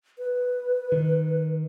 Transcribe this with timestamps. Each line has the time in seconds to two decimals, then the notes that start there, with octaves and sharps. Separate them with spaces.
0.18 B4
0.92 D#3